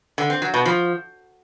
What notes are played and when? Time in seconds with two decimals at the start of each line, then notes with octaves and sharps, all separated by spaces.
0.18 D3
0.30 C4
0.42 F#3
0.54 B2
0.66 F3